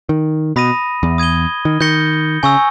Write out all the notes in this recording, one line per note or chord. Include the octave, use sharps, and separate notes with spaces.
D#3
B2 B5 D#6 A#6 D#7
E2
D#6 G#6 D#7 G7
D#3
D#3 G6 A#6 C#7 G7
C#3 G#5 C#6 E6